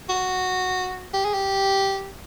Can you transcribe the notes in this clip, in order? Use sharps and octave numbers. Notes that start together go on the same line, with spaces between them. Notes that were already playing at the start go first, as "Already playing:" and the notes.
F#4
G4
G#4
G4